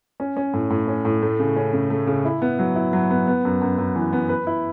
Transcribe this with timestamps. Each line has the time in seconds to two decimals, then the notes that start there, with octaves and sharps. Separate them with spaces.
0.20 C#4
0.37 C#4
0.53 A2
0.70 A2
0.88 C#4
1.05 A2
1.22 A3
1.39 C#3
1.56 C#4
1.73 C#3
1.90 A3
2.07 C#3
2.25 E4
2.42 B3
2.59 F#3
2.76 E4
2.93 F#3
3.10 B3
3.27 B3
3.45 F#2
3.62 F#2
3.78 F#2
3.96 E3
4.13 B3
4.29 B4
4.47 E4